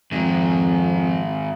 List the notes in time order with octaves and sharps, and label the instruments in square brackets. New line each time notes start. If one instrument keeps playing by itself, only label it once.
[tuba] F2 [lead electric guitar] G#2 D#3